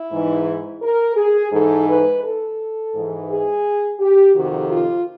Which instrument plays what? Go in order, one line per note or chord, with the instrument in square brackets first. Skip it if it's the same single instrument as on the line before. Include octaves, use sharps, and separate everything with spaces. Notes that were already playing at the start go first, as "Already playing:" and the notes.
Already playing: [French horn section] E4
G#2 E3
A#4
G#4
G#2 E3 A4
B4
A4
G#2 E3
G#4
G4
F2 C3 D#3 F#4
F4